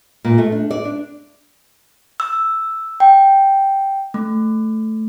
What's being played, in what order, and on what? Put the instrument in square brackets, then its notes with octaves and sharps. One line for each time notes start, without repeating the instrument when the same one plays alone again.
[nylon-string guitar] A#2
A3
D4
D5
D4
[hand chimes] E6
G5
A3